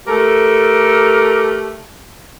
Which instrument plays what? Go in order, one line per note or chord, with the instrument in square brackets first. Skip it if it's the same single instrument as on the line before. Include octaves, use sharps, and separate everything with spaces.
[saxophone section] A3 G4 A4 A#4